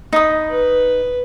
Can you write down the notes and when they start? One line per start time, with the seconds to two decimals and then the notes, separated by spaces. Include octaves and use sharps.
0.13 D#4 B5 D#6
0.50 B4